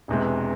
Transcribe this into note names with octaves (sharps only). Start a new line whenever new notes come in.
E1 E2 C3 G#3